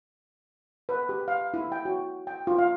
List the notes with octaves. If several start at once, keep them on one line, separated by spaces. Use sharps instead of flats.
B4
G4
F5
E4
G5
F#4
G5
F4
F5